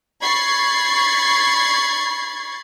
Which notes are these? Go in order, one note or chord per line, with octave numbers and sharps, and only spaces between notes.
B5 C#6 G#6 A6 C7